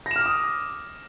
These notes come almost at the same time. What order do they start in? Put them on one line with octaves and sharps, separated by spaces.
A#6 E7 F6 D6 D#6